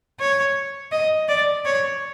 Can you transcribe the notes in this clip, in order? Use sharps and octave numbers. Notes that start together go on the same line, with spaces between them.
C#5
D#5
D5
C#5